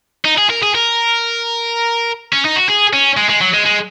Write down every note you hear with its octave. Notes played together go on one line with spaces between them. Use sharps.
D#4
G#4
A#4
G#4
A#4
C#4
D#4
F#4
G#4
C#4
G#3
G#3
F#3
G#3
G#3